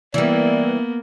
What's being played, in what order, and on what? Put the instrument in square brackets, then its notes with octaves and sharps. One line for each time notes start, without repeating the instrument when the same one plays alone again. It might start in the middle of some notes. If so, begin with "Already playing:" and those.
[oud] E3 G3 [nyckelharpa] A#3 B3 [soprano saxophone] D5